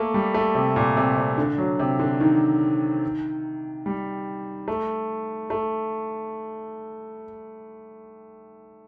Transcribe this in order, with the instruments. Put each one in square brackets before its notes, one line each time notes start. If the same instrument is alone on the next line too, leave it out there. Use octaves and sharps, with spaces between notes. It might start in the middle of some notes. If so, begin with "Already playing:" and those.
Already playing: [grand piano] A3 A#3
G3
A3
C3
A#2
C3
C3
D3
F#3
C3
D3
D#3
G3
A3
A3